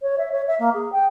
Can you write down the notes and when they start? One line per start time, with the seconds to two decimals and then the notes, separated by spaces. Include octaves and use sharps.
0.01 C#5
0.18 E5
0.31 C#5
0.47 E5
0.59 A#3
0.74 G#4
0.92 G5